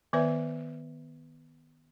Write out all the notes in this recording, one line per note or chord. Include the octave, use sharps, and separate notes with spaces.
D#3 B3 B4 D5 E5